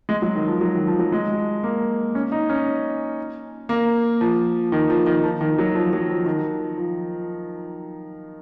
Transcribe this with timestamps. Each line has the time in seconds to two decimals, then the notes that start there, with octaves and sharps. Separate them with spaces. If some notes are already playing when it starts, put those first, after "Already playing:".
0.09 G#3
0.22 F#3
0.35 D#3
0.48 F3
0.61 F#3
0.76 D#3
0.87 F3
0.99 F#3
1.12 G#3
1.63 A#3
2.15 C#4
2.32 D#4
2.49 C#4
3.69 A#3
4.21 F3
4.72 D#3
4.90 F3
5.06 D#3
5.24 F3
5.41 D#3
5.59 F#3
5.75 F3
5.93 F#3
6.09 F3
6.26 D#3
6.78 F3